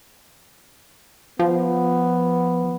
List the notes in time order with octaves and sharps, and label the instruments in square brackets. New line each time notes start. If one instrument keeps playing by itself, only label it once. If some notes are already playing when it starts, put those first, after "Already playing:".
[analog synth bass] F3 [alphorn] B3